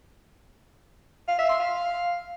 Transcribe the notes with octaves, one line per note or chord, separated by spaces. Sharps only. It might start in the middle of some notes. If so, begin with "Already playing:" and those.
F5
E5
C6
F5